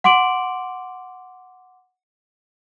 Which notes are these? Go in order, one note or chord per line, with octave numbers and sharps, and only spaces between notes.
F#5 C6 D6 D7 F#7